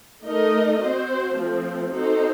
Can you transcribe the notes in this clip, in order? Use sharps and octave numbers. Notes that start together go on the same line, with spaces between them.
A3 D#4 A#4 D#5
C4 F#4 C5
F3 A3 C4
C4 D#4 F#4 A4 C5